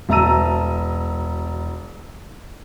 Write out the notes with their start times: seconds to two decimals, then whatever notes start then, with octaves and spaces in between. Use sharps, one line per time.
0.09 E1 E5 A5 A#5 E6 D#7